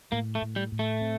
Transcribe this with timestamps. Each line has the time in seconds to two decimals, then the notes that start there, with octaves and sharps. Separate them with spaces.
0.12 A2 A#3
0.35 A3
0.42 A2
0.56 G3
0.72 A2
0.79 A3
1.01 C4